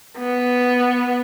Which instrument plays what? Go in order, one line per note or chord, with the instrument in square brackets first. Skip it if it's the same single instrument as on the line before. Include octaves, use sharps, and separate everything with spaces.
[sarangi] B3